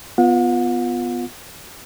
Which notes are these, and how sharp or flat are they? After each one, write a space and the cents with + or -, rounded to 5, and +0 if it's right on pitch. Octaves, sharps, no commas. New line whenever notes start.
B3 +5 F4 +0 F#5 -40